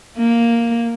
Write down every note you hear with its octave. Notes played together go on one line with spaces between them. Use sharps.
A#3